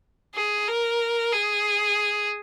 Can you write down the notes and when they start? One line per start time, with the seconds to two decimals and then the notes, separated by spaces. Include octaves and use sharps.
0.35 G#4
0.68 A#4
1.33 G#4